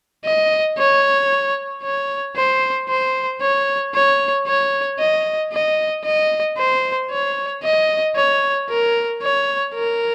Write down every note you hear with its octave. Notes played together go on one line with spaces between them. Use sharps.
D#5
C#5
C#5
C5
C5
C#5
C#5
C#5
D#5
D#5
D#5
C5
C#5
D#5
C#5
A#4
C#5
A#4